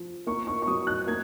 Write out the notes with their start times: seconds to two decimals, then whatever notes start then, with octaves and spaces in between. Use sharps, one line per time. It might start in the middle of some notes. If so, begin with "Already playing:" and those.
Already playing: F3
0.27 A#3 C#6
0.47 C#6
0.62 C#6
0.67 F#3 D#6
0.87 F#6
1.07 A#3 G#6